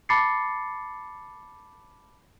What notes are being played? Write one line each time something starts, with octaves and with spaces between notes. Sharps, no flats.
A5 B5 D6 A6 C7 C#7